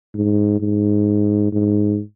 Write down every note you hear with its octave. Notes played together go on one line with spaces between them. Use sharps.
G#2
G#2
G#2